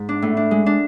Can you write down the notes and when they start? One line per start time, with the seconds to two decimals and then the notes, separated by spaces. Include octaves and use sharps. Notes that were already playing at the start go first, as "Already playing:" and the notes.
Already playing: G#2
0.09 D4
0.22 A2
0.37 D4
0.51 G#3
0.66 D4